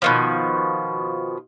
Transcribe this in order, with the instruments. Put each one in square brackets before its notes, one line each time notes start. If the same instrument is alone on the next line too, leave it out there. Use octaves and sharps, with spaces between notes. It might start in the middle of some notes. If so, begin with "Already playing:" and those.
[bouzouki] B2 D#3 F3